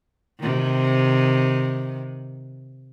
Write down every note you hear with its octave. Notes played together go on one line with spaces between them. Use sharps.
C3 D#3